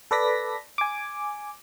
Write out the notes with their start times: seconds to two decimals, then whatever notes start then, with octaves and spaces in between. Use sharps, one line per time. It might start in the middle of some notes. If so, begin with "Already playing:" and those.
0.11 A4 B4 D5 A#6 B6
0.78 G#5 D6